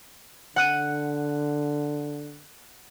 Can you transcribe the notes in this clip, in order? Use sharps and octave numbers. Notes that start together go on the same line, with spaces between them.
D3 F#5 F#6 D#7